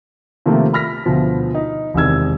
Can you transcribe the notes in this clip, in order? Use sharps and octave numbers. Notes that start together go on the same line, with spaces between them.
C3 D#3 F3 A3 A#3 C4
B5 F6 A#6 B6
D2 B2 F3
D#4
E1 C3 D#3 E6 G#6